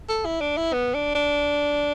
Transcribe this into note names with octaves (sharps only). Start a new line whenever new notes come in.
A4
E4
D4
E4
B3
D4
D4